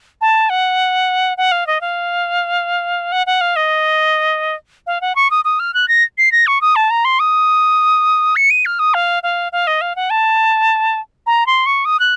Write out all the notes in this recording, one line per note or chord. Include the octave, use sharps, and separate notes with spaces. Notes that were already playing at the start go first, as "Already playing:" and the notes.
A5
F#5
F#5
F5
D#5
F5
F#5
F#5
F5
D#5
F5
F#5
C#6
D#6
D#6
F6
F#6
A#6
C7
A#6
C#6
D#6
A5
A#5
C6
D#6
C#7
D#7
F6
D#6
F5
F5
F5
D#5
F5
F#5
A5
A#5
C6
C#6
D#6
F#6